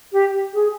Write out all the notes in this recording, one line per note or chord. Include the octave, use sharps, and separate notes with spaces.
G4
G#4